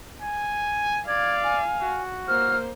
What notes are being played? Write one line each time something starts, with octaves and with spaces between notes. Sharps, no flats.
G#5
D5 F5 G#6
G#5
F#4
A#3 C5 F6